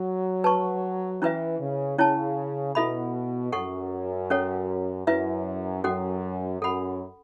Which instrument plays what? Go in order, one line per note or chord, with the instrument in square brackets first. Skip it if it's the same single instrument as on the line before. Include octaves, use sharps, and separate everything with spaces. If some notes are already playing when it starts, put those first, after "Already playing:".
Already playing: [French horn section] F#3
[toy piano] B4 A5 C#6
[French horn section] E3 [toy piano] C#4 E4 B4 E5
[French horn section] C#3
[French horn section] C#3 [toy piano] C#4 E4 C#5 A5
[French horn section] B2 [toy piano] E4 A4 E5 B5
[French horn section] F#2 [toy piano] A4 F#5 C#6
[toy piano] C#4 A4 C#5 F#5
[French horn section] F#2 [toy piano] E4 B4 E5
[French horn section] F#2 [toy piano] C#4 F#4 A4 F#5
[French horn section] F#2 [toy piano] A4 F#5 B5